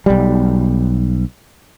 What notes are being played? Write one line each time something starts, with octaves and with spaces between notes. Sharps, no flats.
B1 G3